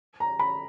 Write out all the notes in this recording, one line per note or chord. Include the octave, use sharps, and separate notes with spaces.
A#5
B5